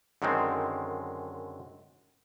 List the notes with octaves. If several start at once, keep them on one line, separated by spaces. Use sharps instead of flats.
F#2 D3 D#3 G#3 C4